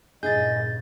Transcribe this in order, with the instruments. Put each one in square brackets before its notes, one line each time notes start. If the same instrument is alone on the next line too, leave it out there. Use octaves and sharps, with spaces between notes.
[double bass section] G2 A#2 C#3 [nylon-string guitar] E4 G#4 [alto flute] D#5 [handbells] G6 A6